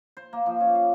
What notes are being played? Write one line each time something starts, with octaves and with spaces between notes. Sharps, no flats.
C5
A#3
F3
C#4
F5